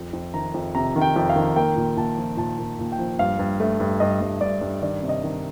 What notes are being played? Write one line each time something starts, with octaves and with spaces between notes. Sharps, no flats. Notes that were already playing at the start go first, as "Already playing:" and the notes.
Already playing: F2
F2
D#3 A#5
F2
C3 A#5
D#3
G5
F2
F5
D#3
A#3 G5
A#2
A#2 A5
F3
A#2 A5
A#2
A#2
G5
F3
G2 F5
G2
A3
G2
G2 D#5
G2
G2 D5
G2
D#3 D5
C3
D#5
D#3